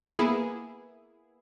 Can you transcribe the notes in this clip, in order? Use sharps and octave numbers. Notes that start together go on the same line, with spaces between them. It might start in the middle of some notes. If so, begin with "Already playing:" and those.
A#3 B3 E4 G#4